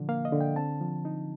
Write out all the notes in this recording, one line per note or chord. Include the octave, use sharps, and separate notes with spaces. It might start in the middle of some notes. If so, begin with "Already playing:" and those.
Already playing: A#2 D3 F3
A#3 F5
D#5
D3
G5
C4 A5
F3
D#4